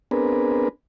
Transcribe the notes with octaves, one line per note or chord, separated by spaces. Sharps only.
B3 C4 D4 G#4 A#4 B4